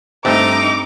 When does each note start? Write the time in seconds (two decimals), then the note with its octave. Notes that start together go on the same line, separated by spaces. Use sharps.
0.25 G2 A3 C4 D#4 D6 F7